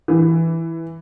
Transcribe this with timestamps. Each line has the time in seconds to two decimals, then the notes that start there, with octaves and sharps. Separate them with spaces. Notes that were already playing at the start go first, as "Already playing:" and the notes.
0.08 E3